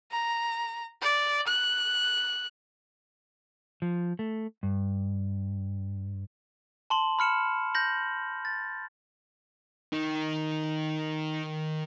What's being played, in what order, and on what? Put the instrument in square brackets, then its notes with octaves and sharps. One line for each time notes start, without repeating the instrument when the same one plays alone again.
[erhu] A#5
D5
F#6
[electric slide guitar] F3
A3
G2
[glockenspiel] A5 C6 F#7
B5 F6 C#7 E7
G6 A#6 F#7
A6
[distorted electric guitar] D#3 D#4